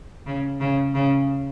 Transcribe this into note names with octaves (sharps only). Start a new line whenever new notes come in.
C#3
C#3
C#3